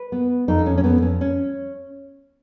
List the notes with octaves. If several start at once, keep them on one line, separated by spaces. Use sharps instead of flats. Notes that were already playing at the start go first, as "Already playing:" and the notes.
Already playing: B4
B3
F2 D#4
C#4
C#4
F2 B3
C#4
C#4